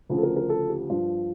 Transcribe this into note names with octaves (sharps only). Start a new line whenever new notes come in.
D2 C#3 F3 F4
A4
A#4
A#4
A4
G4
G2 F3 F4